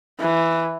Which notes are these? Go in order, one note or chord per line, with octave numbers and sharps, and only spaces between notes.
E3